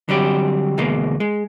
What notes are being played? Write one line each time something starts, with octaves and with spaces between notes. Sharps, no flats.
D3 F#3 G3 C4 G4
D2 B2 E3 G#3 A#3
G#3